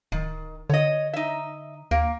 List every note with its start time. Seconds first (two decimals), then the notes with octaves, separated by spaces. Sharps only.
0.12 D1 D#3
0.70 D3 C#5 D#5
1.13 D#4 E5
1.91 D#2 A#3